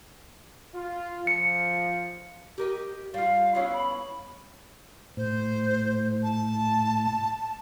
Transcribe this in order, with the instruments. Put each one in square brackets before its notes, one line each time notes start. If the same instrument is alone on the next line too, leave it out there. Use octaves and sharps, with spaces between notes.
[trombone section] F4
[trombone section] F3 [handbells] C#7
[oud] G4 A#4 D#5
[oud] G3 F4 [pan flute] F5
[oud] B3 C#4 E4
[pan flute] B5
[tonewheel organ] A2 [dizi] C5
[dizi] A5